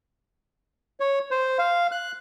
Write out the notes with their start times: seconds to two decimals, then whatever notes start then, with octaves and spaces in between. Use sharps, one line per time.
1.00 C#5
1.31 C5
1.59 F5
1.92 F#6